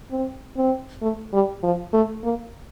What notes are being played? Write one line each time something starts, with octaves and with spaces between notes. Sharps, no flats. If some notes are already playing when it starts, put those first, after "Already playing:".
C4
C4
A3
G3
F3
A3
A#3